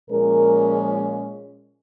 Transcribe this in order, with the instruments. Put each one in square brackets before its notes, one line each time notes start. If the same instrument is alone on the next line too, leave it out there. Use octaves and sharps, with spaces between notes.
[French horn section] A#2 F3 G#3 C#4 A#4